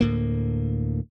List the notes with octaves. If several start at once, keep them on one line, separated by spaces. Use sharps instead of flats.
D2 A2 A#3